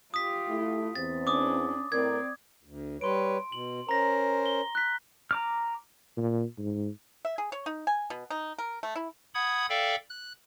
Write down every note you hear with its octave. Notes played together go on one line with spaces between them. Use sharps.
F4 G4 D#6 B6
A3 E4
E2 C4 A6
C#4 D4 D6 D#6
A2 C4 A#4 D5 G#6
D2
G3 B4 C#5 C6 D7
B2 F#7
C#4 A#4 C5 A#5 A#6
G7
F#6 B6
A#5 D6 F6
A#2
G#2
E5
G#4
C#5
D#4
G#5
B2
D#4
A#4
A3
E4
F#5 B5 D#6 G#6
A4 D5 E5 F5 G5
F#6